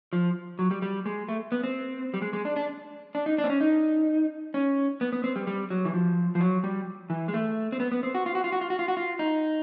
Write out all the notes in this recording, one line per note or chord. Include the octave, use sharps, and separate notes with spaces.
F3
F#3
G3
G3
G#3
A3
B3
C4
G3
G#3
G#3
D4
D4
D4
D#4
D4
C4
C#4
D#4
C#4
B3
B3
C4
G3
G3
F#3
E3
F3
F3
F#3
G3
E3
G#3
A3
C4
B3
B3
C4
F#4
F4
F#4
F4
F#4
F4
F#4
F4
F#4
F4
D#4